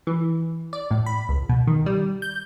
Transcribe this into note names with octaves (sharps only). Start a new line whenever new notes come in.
E3
D5
A2
B5
C#2
B2
D#3
G3
G6